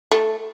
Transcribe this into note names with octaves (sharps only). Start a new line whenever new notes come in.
A3